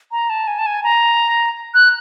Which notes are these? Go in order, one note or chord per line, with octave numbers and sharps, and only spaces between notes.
A#5
A5
G#5
A5
G#5
A#5
F#6